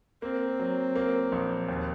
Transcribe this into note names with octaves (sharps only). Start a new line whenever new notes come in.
A#3 C4
F#3
A#3
A#1
D#2